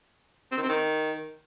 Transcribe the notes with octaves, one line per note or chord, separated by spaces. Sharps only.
C4
D#3
C4
D#3